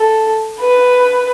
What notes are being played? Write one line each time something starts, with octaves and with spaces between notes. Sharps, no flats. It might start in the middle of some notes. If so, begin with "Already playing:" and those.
Already playing: A4
B4